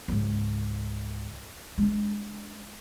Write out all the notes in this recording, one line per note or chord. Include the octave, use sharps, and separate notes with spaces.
C#2 G#2
G#3 D4